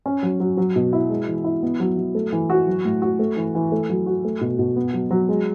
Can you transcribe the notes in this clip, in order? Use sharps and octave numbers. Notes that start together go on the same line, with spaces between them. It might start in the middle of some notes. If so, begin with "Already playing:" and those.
C#4
F#3
F#3
F#3
B2
E4
G#3
E3
E4
B3
F#3
F#3
A3
E3
F#4
F#3
A2
F#4
A3
E3
E3
A3
F#3
F#4
A3
B2
B2
B3
F#3
F#3
G#3